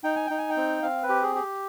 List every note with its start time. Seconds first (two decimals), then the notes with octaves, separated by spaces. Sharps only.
0.04 D#4 G5
0.16 G#5
0.27 D#4 G5
0.38 G#5
0.50 G5
0.56 C4
0.82 C4 F5
1.03 B4
1.09 G4
1.22 G#4
1.35 G4